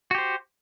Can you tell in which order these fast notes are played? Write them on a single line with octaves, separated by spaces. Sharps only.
F#4 G4 C5